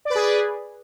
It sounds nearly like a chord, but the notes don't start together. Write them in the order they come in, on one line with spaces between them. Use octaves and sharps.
D5 B4 G#4